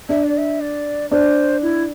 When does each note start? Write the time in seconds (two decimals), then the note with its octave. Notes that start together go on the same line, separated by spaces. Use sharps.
0.09 D4 E5
0.24 D5
0.38 E5
0.60 D5
1.11 D4 C5
1.62 E4